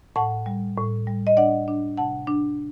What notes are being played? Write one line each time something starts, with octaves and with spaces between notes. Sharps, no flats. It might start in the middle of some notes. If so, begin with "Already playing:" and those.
A2 F#5 A5
G3
A2
G3
D#5
D4 D5 F#5
D4
C3 F#5 A5
D4